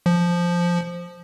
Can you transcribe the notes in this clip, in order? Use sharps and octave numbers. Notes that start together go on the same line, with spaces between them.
F3